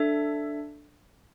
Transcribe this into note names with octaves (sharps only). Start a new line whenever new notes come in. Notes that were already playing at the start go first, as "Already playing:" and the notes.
Already playing: D4 A4 E5